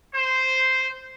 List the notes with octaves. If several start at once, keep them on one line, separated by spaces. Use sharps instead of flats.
C5